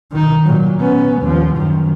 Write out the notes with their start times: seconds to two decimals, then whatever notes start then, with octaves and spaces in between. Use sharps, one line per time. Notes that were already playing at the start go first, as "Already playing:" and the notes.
0.11 D#3 D#4
0.44 A#2 F#3
0.80 B3 C#4
1.21 D#2 F3
1.57 F#2 D#3